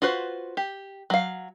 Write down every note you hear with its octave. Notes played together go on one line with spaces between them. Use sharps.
F4 F#4 B4 C5
G4
F#3 F5